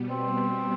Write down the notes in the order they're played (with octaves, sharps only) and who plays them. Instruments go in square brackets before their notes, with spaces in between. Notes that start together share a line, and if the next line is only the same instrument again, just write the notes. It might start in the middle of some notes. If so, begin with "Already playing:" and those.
Already playing: [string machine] B2 G3 B3
[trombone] C4